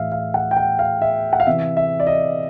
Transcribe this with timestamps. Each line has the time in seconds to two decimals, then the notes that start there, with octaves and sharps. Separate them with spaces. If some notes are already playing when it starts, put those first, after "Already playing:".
Already playing: A2 E3 E5 F5
0.12 F5
0.34 F#5
0.51 G5
0.57 F#5
0.79 F5
1.02 E5
1.33 F#5
1.40 F5
1.47 C3 E3 E5
1.77 E5
2.00 D5
2.07 D#5